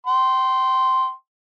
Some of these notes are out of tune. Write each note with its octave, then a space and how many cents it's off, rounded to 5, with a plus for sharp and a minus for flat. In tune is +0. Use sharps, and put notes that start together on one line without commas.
G5 -30 C6 +0